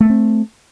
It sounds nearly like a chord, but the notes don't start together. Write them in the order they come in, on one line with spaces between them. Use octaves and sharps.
A3 A#3 C4